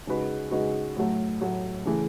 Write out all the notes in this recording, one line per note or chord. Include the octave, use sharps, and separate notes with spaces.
C#3 G#3 D#4 F#4 B4
C#3 G#3 D#4 F#4 B4
A2 F#3 A3
A2 F#3 A3
C#3 E3 A3